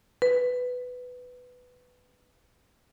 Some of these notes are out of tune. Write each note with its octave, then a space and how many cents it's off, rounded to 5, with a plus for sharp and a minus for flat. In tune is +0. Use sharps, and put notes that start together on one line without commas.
B4 +10